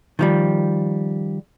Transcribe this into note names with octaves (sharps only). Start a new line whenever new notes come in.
D#3 F3 G3